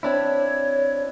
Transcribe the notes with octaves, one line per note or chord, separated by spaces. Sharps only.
C4 D4 E4 C#5